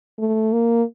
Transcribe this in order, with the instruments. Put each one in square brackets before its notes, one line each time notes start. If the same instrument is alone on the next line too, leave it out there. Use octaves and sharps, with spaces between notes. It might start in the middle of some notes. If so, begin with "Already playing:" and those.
[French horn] A3
A#3